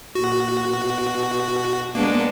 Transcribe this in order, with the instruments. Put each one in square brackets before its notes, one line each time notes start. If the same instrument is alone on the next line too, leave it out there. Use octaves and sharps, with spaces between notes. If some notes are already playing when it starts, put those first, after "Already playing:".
[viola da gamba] A#2 [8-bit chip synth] F#4
[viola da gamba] B2
[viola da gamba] G#3 B3 D4 [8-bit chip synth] A#3